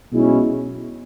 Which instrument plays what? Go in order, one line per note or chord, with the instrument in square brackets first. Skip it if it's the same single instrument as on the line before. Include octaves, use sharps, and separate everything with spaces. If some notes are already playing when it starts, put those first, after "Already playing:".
[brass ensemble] B1 B2 G#3 C#4 E4